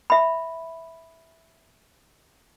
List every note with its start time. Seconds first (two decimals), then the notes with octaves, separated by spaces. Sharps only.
0.10 E5 B5